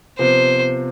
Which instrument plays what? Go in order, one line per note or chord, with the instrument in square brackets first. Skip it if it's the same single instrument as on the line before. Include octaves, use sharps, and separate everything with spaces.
[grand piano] C3 F3 B3 [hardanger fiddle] C5